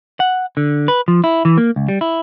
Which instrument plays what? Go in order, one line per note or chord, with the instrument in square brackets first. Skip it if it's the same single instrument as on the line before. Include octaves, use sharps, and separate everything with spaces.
[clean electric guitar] F#5
D3
B4
F3
E4
E3
A#3
C#2
G3
E4